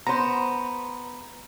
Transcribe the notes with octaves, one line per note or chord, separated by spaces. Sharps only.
B3 C5 A#5